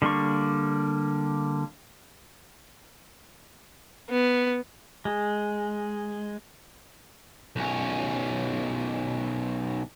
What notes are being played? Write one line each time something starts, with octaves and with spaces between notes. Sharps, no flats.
D3 G3 A#3 D4 C#6
B3
G#3
B1 C#4